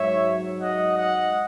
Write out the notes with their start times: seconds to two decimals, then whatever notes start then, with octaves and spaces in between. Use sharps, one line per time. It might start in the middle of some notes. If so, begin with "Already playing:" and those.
Already playing: G#2 F#3 C#5 E5
0.61 D#5 F#5
0.96 D#5 F#5